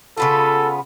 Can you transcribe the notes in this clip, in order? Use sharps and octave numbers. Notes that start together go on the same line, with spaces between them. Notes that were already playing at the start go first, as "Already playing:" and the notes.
C#3 B3 F4 A4